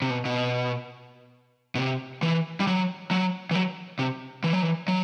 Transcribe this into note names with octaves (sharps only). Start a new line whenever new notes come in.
C3
B2
B2
B2
C3
E3
G3
F#3
F#3
E3
F#3
C3
E3
F#3
E3
F#3